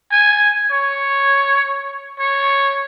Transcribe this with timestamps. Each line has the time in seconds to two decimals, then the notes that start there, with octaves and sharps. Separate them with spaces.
0.12 G#5
0.72 C#5
2.20 C#5